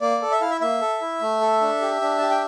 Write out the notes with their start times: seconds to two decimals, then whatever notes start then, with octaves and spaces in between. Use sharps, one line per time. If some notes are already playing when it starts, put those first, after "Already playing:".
0.01 A#3 D5
0.22 A4
0.31 E5
0.41 E4 F5
0.50 E5
0.61 A#3 E5
0.81 A4
1.01 E4
1.21 A3
1.41 A4
1.61 D4
1.81 G4
2.01 D4
2.18 G4 A5
2.30 G5